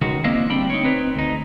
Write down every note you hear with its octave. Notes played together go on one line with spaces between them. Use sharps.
C#2 D#3 G#3 F#4
A#3 C4 D4 E4 D#5 F5
D2 G3 C4 D4 G5 B5
D#4 C#5
C4 D#4 B4 C#5
D2 D#4